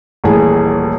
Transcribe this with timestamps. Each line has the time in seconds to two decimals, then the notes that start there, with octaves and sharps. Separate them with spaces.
0.24 D#1 A1 E3 G#4